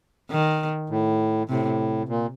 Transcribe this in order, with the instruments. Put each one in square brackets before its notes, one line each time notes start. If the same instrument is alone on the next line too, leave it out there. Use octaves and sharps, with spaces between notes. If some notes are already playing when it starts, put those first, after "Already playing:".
[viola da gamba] D#3
[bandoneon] A2
[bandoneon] A2 [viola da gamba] C3
[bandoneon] A#2